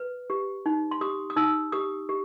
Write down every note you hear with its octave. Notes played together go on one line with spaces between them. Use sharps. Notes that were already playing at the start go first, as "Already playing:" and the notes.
Already playing: B4
G4
D#4
C6
G4 D#6
D#6
D#4 E6
G4 D#6
G4